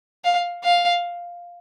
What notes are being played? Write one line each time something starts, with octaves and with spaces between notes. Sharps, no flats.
F5
F5